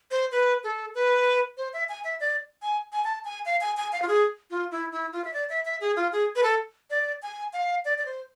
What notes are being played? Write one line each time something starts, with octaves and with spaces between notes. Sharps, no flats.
C5
B4
A4
B4
C5
E5
G#5
E5
D5
G#5
G#5
A5
G#5
F5
G#5
G#5
F5
F4
G#4
F4
E4
E4
F4
E5
D5
E5
E5
G#4
F4
G#4
B4
A4
D5
G#5
F5
D5
D5
C5